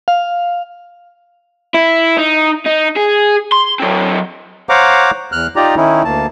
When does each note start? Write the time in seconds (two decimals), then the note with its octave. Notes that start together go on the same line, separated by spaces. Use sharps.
0.08 F5
1.74 E4
2.18 D#4
2.66 D#4
2.97 G#4
3.52 C6
3.80 F#3 C4
4.69 C5 C#5 F5 F#5 A#5 D6
5.32 E2 F6 F#6
5.56 D#4 F4 G4 D5 A#5
5.77 D#3 C#4 D#4 E4
6.05 D2 A#3 A5